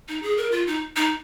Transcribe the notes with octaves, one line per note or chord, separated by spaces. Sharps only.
D#4
G#4
A#4
F4
D#4
D#4